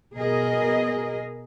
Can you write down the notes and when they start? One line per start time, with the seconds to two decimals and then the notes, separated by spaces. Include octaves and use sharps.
0.14 B2 G#4 A#4 D#5